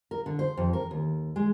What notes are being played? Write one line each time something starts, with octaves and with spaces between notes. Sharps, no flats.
A#4
D3
C5
F2
A#4
D#2
G#3